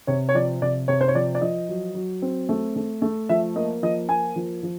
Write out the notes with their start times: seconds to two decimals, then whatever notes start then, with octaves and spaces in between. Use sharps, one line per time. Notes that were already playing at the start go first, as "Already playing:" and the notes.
0.07 C3 C#5
0.29 C#5
0.34 F3 D5
0.61 C3 D5
0.88 C3 C#5
1.01 C5
1.08 C#5
1.15 F3 D5
1.35 D5
1.41 F3 D#5
1.69 F#3
1.95 F#3
2.22 C4
2.49 A3
2.76 A3
3.02 A3
3.29 F3 E5
3.56 A#3 D#5
3.83 F3 D#5
4.09 A#3 G#5
4.36 F3
4.63 F3